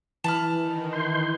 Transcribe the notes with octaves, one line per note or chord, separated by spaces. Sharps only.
E3 A5 B5 F6
D#3
C6 G6